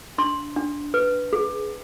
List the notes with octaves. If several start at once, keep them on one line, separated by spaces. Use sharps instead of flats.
D4 C6
D4
B4
G#4